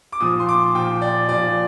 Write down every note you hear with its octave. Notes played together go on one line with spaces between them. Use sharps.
D6
A#2 F3 D#6
C6
D6
A#2 F3 G5
D5
A#2 F3 D5